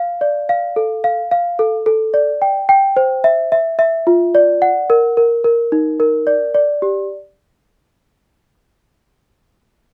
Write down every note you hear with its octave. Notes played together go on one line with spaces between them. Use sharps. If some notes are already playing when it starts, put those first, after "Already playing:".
Already playing: F5
D5
F5
A4
F5
F5
A4
A4
D5
G5
G5
C5
E5
E5
E5
F4
D5
F#5
A#4
A#4
A#4
D#4
A#4
D5
D5
G4